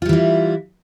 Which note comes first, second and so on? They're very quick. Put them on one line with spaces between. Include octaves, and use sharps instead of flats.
F4 G3 E3 E4